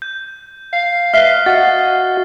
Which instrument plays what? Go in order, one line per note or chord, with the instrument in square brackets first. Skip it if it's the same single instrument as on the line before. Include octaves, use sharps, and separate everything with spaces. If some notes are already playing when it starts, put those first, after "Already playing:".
[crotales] G6
[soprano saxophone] F5
[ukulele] B4 D#5 E5 [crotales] F6 C7 G7
[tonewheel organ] F#4 [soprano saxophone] D#5 [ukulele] F5 F#5 [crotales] A6